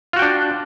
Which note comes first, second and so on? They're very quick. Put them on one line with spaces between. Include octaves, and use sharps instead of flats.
F4 F#4 G5 D4